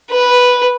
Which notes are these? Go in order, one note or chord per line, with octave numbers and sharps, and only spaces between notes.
B4